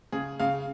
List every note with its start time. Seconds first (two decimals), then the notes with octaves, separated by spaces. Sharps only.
0.12 C#3 G#4
0.40 C#3 F5